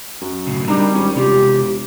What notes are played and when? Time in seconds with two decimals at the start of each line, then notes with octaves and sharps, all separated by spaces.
0.21 F#2
0.47 B1 A2 C#3
0.67 D#3 G3 C4 D4 A#5
0.95 G#1 C#4
1.16 E1 C3 F4 G4